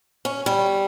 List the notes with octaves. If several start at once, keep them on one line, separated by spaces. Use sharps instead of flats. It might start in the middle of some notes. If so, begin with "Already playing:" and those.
C#4
G3